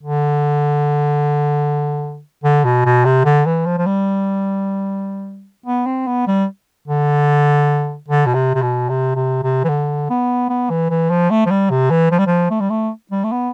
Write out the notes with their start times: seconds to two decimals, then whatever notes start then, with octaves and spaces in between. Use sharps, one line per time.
0.03 D3
2.44 D3
2.64 B2
2.85 B2
3.05 C3
3.25 D3
3.46 E3
3.66 F3
3.78 F3
3.86 G3
5.66 B3
5.86 C4
6.07 B3
6.27 G3
6.88 D3
8.08 D3
8.26 B2
8.34 C3
8.54 C3
8.62 B2
8.89 C3
9.15 C3
9.43 C3
9.64 E3
9.69 D3
10.10 B3
10.49 B3
10.70 E3
10.90 E3
11.10 F3
11.30 A3
11.46 F3
11.50 G3
11.70 C3
11.90 E3
12.11 F3
12.18 G3
12.27 F3
12.50 A3
12.60 G3
12.70 A3
13.11 G3
13.24 A3
13.31 B3